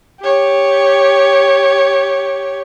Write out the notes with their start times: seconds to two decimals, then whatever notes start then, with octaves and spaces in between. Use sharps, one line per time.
0.21 G4 C#5